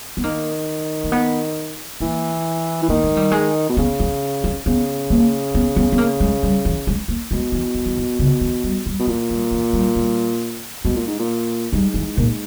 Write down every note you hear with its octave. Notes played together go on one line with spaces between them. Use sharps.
B3
D#3 A#3
A#3
B3
E3 A#3
E3
D#3 A#3
G#3
G3
G#3
B2
C#3 B3
C#4
C#4
C#3 B3
A#3
B3
B3
B3
A#3
G#3
G3
E3
G#3
A#3
B2 G#3
E3
D#3
E3
D#3
C#3
D#3
G3
G3
B2
A#2 E3
G3
E3
G3
G3
B2 G#3
A#2
G#2
A#2
G#2 G3
E3
A#2